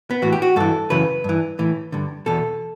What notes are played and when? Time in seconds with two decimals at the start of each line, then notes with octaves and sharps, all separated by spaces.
0.11 B3
0.22 A2 E3 F#4
0.32 G4
0.42 F#4
0.56 G2 E3 A4
0.90 F#2 C#3 E3 B4
1.24 G2 E3
1.59 A2 E3
1.92 G2 D3
2.26 E2 B2 A4